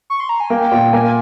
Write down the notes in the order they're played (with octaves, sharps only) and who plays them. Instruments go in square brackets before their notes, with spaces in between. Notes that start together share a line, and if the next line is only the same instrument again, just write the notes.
[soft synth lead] C#6
C6
A#5
G#5
[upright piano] A#3 [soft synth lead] G5
[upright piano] A#2
[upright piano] A#3 [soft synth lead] G#5